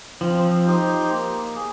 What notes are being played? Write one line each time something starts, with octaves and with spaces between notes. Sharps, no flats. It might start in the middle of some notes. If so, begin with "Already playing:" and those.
F3 C4
D#4 G4 C5
A#3
G#4